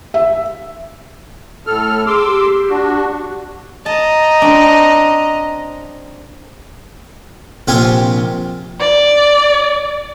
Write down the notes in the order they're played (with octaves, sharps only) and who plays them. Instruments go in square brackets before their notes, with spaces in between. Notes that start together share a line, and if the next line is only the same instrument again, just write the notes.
[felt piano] E5
[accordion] A2 A4 F6
[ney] G#4 [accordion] C6 D6 E6
[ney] G4
[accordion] D4 F#4
[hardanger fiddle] D#5 A#5 [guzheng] A5
[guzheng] C4 D4
[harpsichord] A#1 C3 F4 G4 G#5
[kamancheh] D5